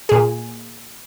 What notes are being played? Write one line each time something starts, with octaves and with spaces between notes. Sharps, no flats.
A#2 G#4